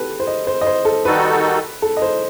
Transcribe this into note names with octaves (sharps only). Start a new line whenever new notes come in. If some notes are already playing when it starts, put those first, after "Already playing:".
Already playing: G4 A4 B4
C5
D#5
C5
D#5
C5
A4
D#3 G3 D#4 F#4 A4 B4
A4
D#5
C5